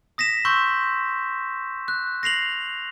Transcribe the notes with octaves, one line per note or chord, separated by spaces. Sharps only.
D#6 A#6 B6 E7
C6 C#6 E6 G6
F#6
A#6 C7 F7 F#7